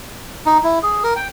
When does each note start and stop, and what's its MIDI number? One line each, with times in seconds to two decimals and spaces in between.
0.46 0.58 63
0.63 0.79 64
0.83 1.03 68
1.03 1.14 70
1.16 1.28 79